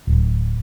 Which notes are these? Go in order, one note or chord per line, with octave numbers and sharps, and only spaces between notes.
D1